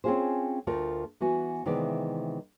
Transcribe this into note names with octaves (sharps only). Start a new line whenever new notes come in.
C4 C#4 D#4 F4 G#4 C5
D2 A3 F4 A#4
E3 B3 F#4 G#5
C3 D#3 E3 G#3 B3 D5